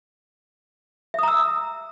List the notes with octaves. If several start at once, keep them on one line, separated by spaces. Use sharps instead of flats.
E5 A#5 D#6 E6